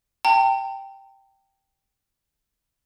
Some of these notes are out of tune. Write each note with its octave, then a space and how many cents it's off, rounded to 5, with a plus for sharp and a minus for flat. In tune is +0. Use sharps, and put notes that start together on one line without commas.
G5 +0 A#5 -45